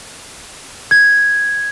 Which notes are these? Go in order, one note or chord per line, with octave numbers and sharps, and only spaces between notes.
G#6